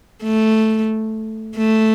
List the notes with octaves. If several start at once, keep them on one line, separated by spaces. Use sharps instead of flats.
A3
A3